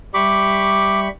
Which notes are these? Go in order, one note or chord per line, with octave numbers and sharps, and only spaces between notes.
G3 G4 E5 B5 C#6 D6